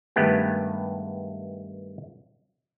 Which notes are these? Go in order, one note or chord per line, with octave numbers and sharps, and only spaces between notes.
G2 D#3 G#3 A3 B3 G4